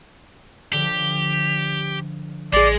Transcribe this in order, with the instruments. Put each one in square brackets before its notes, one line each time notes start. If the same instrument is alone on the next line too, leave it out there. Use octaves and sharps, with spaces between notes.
[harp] D3 F3 [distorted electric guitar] G4
[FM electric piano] A1 G#4 [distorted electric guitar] G#3 [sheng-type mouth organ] D5